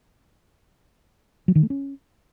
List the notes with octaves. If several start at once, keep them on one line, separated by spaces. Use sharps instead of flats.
F#3
D#3
A3
C#4